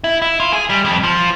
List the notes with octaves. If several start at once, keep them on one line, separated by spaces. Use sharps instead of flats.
E4
E4
F4
G#4
G3
F2
F3